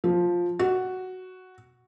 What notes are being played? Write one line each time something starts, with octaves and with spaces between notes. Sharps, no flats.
F3
F#4